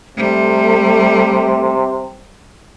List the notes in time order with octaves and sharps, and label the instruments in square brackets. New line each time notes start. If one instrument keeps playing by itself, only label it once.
[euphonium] C3 [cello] G3 [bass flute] A3